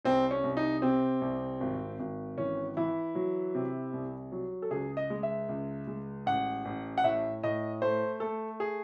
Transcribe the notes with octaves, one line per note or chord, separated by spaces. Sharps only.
C2 C4
C#4
C2
D#4
C3 C4
C2
G#1
G#1
E3 C#4
E3 E4
F#3
C3
C2
F#3
A4
C#2 G#4
D#5
G#3
E5
C#2
G#3
A1 F#5
A1
F#5
A2 E5
A2 D#5
A3 C5
A3 A4
G#4